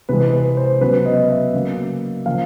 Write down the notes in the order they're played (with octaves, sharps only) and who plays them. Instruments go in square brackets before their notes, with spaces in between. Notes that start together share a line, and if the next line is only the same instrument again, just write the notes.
[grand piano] C3 E3 G#3 B4
B4
C5
C#3 F#3 B3 B4
D#5
E5
C#3 F#3 A#3
C#3 F3 A#3 F5